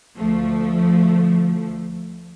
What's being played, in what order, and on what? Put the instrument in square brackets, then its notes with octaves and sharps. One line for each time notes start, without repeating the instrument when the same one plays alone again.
[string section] D2 F3 A3